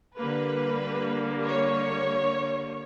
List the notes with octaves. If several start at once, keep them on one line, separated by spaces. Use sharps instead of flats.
D3 G3 A#3 B4
C#5